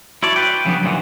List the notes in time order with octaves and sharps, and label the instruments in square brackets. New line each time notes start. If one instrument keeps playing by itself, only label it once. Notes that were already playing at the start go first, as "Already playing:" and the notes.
[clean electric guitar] E4 C#5 D5 [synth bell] F#4 A5 C6
[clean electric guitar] B4 G5 [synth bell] C#7
[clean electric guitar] C#3 B3 [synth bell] F3 F#3 D4
[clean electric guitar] D#2 A#2 E3 [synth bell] F#5